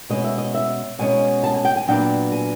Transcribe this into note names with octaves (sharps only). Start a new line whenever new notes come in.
B2 G#3 C#4 D#5
E5
D#5
E5
B2 G#3 C#4 G#5
A5
G#5
G5
G#5
A#2 F#3 B3 D4 G5
G#5